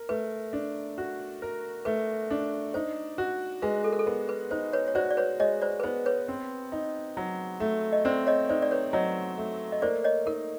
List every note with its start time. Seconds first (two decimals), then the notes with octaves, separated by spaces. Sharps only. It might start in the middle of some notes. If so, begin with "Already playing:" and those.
Already playing: A#4
0.09 A3 B4
0.53 D4
0.98 F#4
1.42 A#4
1.85 A3 B4
2.31 D4
2.74 D#4 C5
3.18 F#4
3.62 G#3 B4
3.84 A4
3.92 A#4
3.99 A4
4.06 B3 A#4
4.29 B4
4.51 D#4 C5
4.73 B4 C#5
4.88 C#5
4.95 F#4 C5 D5
5.11 D5
5.17 B4 C#5
5.39 G#3 C#5 D#5
5.61 C5 D5
5.80 B4
5.83 B3 C5
6.06 B4 C#5
6.28 C4
6.72 D#4
7.17 F#3
7.60 A3
7.93 D#5
8.05 C4 C5 D5
8.27 C#5 D#5
8.49 D#4 C5 D5
8.62 D5
8.71 B4 C#5
8.93 F#3 C#5 D#5
9.37 A3
9.72 D#5
9.82 A#3 C5 D5
10.04 C#5 D#5
10.26 D#4 A#4